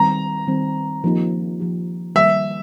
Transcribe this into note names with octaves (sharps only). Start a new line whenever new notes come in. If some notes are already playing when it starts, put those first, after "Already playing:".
Already playing: D#3 G3 C4 A#5
D#3 G3 C4
F3 A#3 D#4 G4
F3 A#3 D#4 G4
D#3 G3 A#3 E5